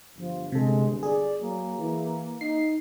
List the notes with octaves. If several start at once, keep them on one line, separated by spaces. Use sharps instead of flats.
G1 F3
C3 G#3 A4
G#4 D5
F#3 A#3
E3
D#4 C7